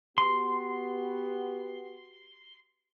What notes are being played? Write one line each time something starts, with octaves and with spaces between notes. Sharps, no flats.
B3 F#4 G4 C6